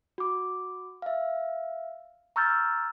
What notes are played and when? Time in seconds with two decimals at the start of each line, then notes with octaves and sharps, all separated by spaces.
0.18 F#4 D6
1.02 E5 F5
2.36 A#5 C#6 E6 F6 G6 A6